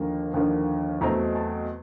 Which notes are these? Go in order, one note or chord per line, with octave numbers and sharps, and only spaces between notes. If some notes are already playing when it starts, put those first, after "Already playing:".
Already playing: D#2 D3 F3 A#3
D#2 D3 F3 A#3
E2 B2 F#3 A3 C4 A#5
A5